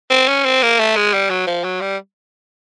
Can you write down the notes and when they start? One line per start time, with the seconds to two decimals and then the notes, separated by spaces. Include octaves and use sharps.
0.10 C4
0.28 C#4
0.45 C4
0.63 A#3
0.79 A3
0.96 G#3
1.14 G3
1.30 F#3
1.47 F3
1.64 F#3
1.81 G3